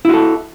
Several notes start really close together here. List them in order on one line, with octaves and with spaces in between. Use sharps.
E4 F#4 A4